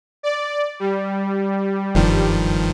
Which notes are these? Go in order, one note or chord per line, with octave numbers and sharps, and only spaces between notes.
D5
G3
F#1 G2 D#3 F3